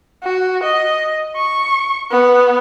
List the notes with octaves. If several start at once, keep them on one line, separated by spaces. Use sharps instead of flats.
F#4
D#5
C#6
B3